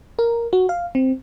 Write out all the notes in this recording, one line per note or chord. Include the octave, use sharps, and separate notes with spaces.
A#4
F#4
F5
C4